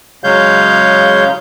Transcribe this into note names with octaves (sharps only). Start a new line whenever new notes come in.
C#3 F#3 G#3 C#5 F5 G6